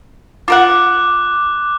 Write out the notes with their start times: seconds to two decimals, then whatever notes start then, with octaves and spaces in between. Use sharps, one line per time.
0.48 F4 A#4 F#5 D6 F#6